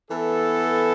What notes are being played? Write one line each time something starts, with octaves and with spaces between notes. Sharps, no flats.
E3 B3 E4 A4